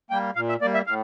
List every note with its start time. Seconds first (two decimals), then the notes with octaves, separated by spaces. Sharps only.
0.10 G3 A#3 G5
0.36 A#2 F5
0.49 E5
0.61 A#3 D5
0.65 G3
0.74 E5
0.87 A2 F5